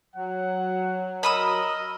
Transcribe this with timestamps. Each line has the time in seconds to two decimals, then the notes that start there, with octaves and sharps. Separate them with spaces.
0.16 F#3 F#5
1.23 A#4 D#5 B5 D#6 E6